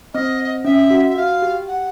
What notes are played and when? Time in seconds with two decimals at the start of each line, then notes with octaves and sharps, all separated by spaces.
0.14 C4 D#5
0.65 C#4 E5
0.91 F#4
1.08 E5
1.16 F#4 F5
1.42 G4
1.68 F#5